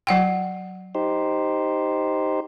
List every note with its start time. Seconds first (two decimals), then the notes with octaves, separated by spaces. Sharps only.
0.07 F#3 F#5 G5
0.95 D#4 G4 C5